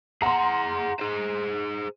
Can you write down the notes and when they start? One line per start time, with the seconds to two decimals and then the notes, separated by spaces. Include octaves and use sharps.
0.22 G#4 F#5 A#5 C6
1.00 G#4 C5